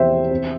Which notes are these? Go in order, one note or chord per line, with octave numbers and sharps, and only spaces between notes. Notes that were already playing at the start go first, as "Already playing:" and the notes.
Already playing: E2 C3 C4 C5 E5 G5
C4